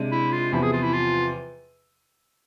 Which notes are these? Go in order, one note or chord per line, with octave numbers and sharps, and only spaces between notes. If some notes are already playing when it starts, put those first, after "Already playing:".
Already playing: C3 G#3 D4
E4
F4
E2 C3 F3 E4
G#4
F4
E4
F4